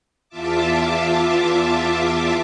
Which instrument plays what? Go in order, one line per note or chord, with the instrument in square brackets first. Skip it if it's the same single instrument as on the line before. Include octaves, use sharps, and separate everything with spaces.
[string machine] E2 F4 E5 A5 D6